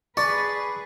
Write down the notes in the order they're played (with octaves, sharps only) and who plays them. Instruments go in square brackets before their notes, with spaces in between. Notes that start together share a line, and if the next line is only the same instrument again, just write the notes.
[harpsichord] D4 D5 [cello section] G#4 B4 [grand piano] C#6